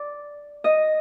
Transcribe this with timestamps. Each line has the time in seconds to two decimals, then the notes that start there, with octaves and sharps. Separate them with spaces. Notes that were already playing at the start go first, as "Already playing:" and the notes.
Already playing: D5
0.64 D#5